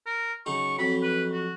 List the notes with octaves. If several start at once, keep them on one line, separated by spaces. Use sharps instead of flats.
A#4
C#3 F#3 D#4 C#6
F2 F#3 B5
B4
F#4